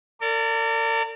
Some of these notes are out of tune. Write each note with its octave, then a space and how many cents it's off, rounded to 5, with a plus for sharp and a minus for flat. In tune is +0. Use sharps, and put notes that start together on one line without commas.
A#4 -45 D5 -15